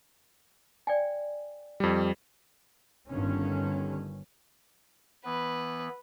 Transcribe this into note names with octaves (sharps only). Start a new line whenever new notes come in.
D5 G5 G#5
F2 G3
G1 G2 D3 D#3 C#4
E3 B3 B4